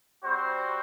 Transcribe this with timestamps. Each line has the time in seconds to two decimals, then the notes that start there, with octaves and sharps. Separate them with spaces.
0.24 G3 C4 F#4 C5